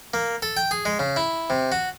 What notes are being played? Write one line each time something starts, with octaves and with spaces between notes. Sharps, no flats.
A#3
A4
G5
G#4
G#3
C#3
E4
C3
F#4